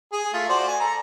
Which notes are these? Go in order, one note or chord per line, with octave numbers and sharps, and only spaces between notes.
G#4
A3 F4
F#4 C5 D5
G#5
A4 A#5